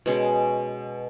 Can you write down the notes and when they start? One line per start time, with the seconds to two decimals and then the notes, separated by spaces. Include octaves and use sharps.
0.06 B2 G#3 C#4